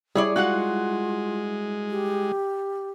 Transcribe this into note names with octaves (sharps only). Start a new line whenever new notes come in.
G3 E4 G#4 C#5 D5
G#3 F4 F#4 F5 F#5
G4